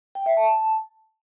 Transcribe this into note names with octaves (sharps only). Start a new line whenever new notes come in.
G5
E5
A5